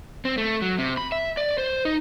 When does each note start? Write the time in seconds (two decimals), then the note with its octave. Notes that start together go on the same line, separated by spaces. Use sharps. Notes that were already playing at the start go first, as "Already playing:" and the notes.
0.25 C4
0.38 A3
0.62 F#3
0.78 C3
0.97 B5
1.12 E5
1.37 D5
1.58 C5
1.85 D#4